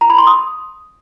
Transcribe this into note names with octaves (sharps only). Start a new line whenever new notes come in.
A#5
B5
C6
D#6